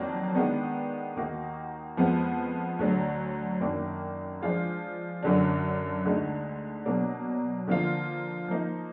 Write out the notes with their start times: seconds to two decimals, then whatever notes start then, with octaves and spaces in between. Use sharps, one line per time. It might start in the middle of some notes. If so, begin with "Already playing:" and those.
Already playing: F2 D#3 F#3 A#3 D4
0.35 D#3 G#3 B3 D4
1.16 D#2 D#3 A#3 D#4 F#4
1.97 F2 F3 G#3 B3
2.79 D2 D3 F#3
3.60 F#2 D#3 A#3 D4
4.41 F3 G#3 D4 F4 G#4
5.23 F#2 D3 F#3 D4
6.05 D2 D3 G#3 D#4
6.86 B2 F#3 A#3 D4
7.67 D3 F3 A#3 F4
8.48 F3 A#3 D#4